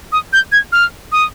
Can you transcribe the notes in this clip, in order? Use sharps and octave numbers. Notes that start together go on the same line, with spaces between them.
D#6
G6
G#6
F6
D#6